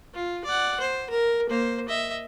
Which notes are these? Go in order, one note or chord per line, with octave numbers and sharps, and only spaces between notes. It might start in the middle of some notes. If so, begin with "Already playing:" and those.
F4
D5 F#5
C5
A#4
A#3 C5
D#5 E5